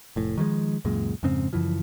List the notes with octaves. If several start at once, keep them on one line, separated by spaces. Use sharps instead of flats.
F1 A2
D#3 F3 G3 G#3
C#2 F#2 A#2 G#3
F2 G#2 C#3 C4
F#2 C#3 E3 F3